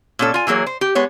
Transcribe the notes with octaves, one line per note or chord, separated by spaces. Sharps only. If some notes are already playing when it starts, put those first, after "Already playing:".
A#2 C#4 A4
F4 G#5
E3 F#3 A#3 G#4 C#5
C5
G4
G#3 B3 C#5